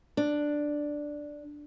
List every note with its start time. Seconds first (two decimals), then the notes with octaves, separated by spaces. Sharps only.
0.17 D4